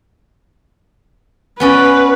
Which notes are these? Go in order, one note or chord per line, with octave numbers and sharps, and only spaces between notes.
B3 C#4 B4 D5